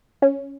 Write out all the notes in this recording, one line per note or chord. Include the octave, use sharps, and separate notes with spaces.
C#4